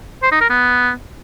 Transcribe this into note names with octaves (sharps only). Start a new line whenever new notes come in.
C5
D#4
A#4
B3